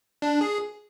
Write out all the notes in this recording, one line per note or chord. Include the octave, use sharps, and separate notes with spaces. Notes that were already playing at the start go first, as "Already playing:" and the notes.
D4
G#4